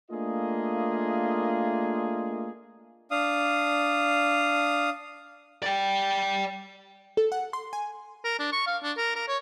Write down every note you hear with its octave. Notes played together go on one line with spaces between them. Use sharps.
A3 A#3 D4 F4 G#4 D#5
D4 F5 D#6
D5 G5
A4
F#5
C6
G#5
A#4
D4
C#6
F5
D4
A#4
A#4
C#5